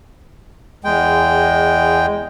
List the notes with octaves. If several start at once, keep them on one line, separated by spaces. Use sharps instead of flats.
E2 G#3 G5